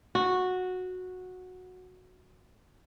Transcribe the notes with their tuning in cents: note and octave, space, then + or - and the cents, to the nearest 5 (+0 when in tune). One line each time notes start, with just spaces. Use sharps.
F#4 -10